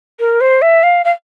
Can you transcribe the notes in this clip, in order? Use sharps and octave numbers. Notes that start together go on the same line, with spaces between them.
A#4
C5
E5
F5
F5